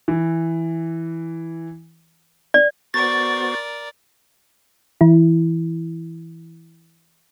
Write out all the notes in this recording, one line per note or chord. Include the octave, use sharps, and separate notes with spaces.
E3
D5
B3 F#4 A#4 C5 D5 C#6 A6
E3 E4